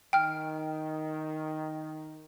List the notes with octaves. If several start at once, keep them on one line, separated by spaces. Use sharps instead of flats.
D#3 G5 F6